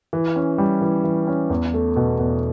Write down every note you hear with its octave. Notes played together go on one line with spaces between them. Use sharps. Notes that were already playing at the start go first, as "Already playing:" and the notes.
E3
C#4
G3
E3
E3
C#4
E2
A3
B2
E2